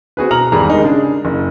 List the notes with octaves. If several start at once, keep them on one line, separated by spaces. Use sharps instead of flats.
C4 F#4 G#4 B4
B2 A#5 F6 F#7
G#1 E2 G3 G#4 A#5
D#3 G#3 D#4
C#3 D4 G#4
F#1